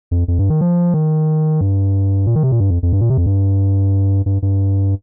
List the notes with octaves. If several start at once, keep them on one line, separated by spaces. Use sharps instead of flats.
F2
F2
G2
D#3
F3
D#3
G2
A#2
D#3
C3
A#2
G2
F2
F2
G2
A#2
C3
F2
G2
G2
G2